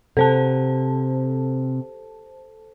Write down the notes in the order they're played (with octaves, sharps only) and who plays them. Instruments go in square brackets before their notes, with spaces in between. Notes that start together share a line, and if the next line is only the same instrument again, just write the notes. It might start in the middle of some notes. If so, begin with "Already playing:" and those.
[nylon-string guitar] C3 [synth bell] A4 C5 A5